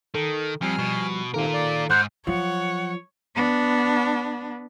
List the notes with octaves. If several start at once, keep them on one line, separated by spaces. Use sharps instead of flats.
D#3 A4
F2 F3 G3 G#5 F6 C7
B2
G#2 C3 D#3 A#3 F4 A4 A#4
D5
G#2 C5 F#5 F6
F3 F#3 C#5 F#5
B3 D4